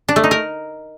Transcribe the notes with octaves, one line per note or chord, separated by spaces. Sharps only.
D4
A3
D#4
A#4